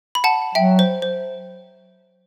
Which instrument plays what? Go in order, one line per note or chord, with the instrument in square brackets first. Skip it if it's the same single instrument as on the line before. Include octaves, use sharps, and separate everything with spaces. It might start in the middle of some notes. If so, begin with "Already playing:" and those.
[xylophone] B5
F#5 A5
[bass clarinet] F#3 [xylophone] E5 G5
[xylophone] C5
C5